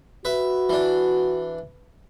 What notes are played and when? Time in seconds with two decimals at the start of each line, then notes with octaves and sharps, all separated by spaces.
0.25 F#4 B4 E5
0.69 E3 D4